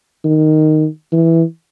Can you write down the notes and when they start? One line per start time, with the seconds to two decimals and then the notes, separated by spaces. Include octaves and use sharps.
0.25 D#3
1.12 E3